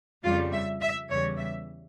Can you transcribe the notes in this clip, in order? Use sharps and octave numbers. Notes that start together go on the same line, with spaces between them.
F2 C#3 G3 F4
E5
E5
E2 C#3 E3 G3 C#5
E5